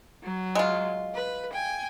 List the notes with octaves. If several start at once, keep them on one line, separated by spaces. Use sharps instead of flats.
F#3
G#3 F4
B4
G5 G#5